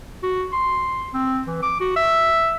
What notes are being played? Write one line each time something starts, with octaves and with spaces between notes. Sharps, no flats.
F#4
C6
C4
E3
D6
F#4
E5